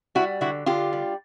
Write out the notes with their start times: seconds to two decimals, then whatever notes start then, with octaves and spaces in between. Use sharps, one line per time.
0.15 G3 E4 F#4
0.41 D3 E4 F#4
0.66 D3 F4 G4
0.93 G3